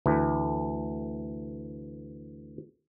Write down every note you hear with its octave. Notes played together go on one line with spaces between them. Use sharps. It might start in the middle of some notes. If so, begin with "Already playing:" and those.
D2 E3